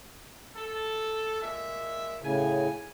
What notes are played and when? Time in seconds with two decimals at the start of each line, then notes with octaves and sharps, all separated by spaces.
0.56 A4
1.41 A#2 G#3 E5
2.22 A2 C#3 G#5